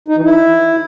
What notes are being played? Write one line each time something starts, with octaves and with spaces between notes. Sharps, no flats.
D#4
E3
E4